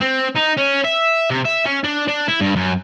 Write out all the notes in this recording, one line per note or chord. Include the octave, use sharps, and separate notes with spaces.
C4
D#4
C#4
E5
C3
E5
C#4
D4
D4
E4
G2
F#2